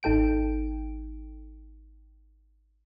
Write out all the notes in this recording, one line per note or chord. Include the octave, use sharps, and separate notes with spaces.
G#1 D#4 A4 G5 D7